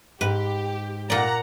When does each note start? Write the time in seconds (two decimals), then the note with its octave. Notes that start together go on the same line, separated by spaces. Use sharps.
0.21 G#2 G4 B4
1.10 A#2 D5 F#5 A#5